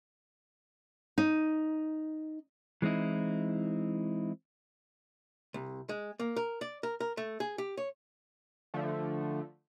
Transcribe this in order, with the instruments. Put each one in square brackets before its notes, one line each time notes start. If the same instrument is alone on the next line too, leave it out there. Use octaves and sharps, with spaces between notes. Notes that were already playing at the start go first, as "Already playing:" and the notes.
[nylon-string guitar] D#4
[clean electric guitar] E3 G#3 C4 D#4 E4
[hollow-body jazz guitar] C2
G#3
A#3
A#4
D5
A#4
A#4
A3
G#4
G4
C#5
[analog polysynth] D3 F3 A3